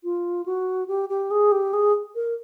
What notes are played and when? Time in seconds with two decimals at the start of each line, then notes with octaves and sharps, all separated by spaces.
0.04 F4
0.46 F#4
0.88 G4
1.09 G4
1.31 G#4
1.52 G4
1.73 G#4
2.15 A#4